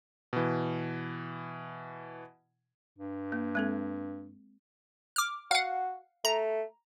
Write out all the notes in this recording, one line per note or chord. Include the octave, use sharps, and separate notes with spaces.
B2 E3
G2
A#3
G#3 C4 A4
D6 F6
F#4 F5 F#5
A3 A#5